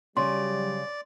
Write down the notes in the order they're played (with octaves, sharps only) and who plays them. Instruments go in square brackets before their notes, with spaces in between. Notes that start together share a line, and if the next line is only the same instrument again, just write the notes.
[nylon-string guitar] C#3 [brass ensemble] F#3 G3 [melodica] D5 [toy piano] C6